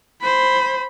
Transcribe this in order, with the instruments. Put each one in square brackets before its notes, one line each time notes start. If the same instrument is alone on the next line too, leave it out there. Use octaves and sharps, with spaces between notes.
[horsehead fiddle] C5 B5